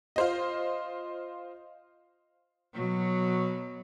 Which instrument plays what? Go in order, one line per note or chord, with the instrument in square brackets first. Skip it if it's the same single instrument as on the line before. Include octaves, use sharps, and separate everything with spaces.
[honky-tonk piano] F4 C5 D#5
[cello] B2 F#3